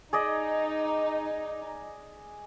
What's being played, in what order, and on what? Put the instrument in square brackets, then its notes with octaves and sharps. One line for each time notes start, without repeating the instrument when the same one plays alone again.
[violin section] D#4 [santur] G#4 D5 D#5